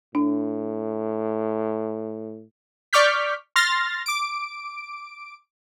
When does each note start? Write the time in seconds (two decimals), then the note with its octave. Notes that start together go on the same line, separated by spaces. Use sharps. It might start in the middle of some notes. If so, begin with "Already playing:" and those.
0.15 A2 D4
2.93 D5 C#6 D6 F6 G6 B6
3.56 C6 F6 A6 A#6
4.06 D6 D7